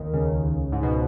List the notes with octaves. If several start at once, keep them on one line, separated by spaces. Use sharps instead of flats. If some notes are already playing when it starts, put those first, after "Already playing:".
Already playing: D#2 D#3
C#2 C#3
G#2
B2